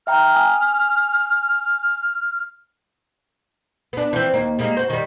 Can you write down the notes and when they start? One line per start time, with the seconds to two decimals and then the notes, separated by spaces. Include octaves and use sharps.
0.07 E5 G5 A#5 F6
0.35 G#5 D#6
3.93 B3 D4
4.13 E3 F3 C4
4.34 D#2 A#3
4.59 G3 G#3 A#3
4.77 F#4 C5
4.90 D#3 G3